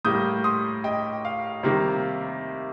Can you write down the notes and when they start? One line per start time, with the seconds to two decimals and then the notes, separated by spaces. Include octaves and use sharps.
0.05 A2 G3 A#3 D#6 G6
0.44 C6 D#6
0.84 D#5 G5
1.25 F5
1.63 C3 D#3 G3 A#3